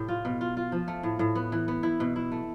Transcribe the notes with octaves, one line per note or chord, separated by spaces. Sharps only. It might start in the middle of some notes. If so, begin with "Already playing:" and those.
Already playing: A2 C3 G4
F4
B2
F4
F4
F3
A3
A2
A2
B3
E3
B3
E4
B2
E4
A3